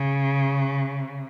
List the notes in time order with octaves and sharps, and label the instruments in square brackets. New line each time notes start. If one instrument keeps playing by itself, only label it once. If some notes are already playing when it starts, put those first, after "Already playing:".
Already playing: [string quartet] C#3